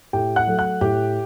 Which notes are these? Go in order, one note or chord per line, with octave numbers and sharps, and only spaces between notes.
A2 G4 G5
F#5 F#6
F#3 A3
F#5 F#6
A2 G4 G5